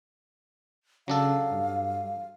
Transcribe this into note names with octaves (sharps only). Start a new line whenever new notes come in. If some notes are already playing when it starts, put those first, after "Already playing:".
C#3 F#3 D4 A4 F5
G2